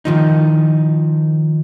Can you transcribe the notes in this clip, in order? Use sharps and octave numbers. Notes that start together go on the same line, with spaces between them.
D#3 F3 D#4